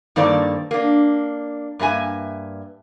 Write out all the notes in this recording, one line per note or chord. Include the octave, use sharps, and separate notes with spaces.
G2 D#3 A#3 A4 C5 D5
A#3 D4
G2 A#3 E5 G#5